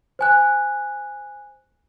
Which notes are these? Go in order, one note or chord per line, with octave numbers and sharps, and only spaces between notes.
C5 G#5 F#6